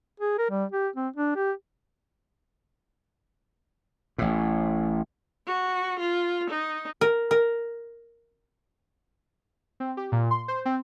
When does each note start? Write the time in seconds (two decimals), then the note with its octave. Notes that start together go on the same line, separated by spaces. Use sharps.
0.20 G#4
0.38 A#4
0.50 G3
0.72 G4
0.96 C4
1.16 D4
1.36 G4
4.18 A1 A2
5.47 F#4
6.00 F4
6.50 D#4
7.01 A#4
7.31 A#4
9.80 C4
9.97 G4
10.12 A#2
10.31 C6
10.48 C5
10.65 C4